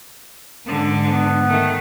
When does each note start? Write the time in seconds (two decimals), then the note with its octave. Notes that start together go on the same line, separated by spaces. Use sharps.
0.66 G#2 D3
1.05 B3
1.48 D#3 A3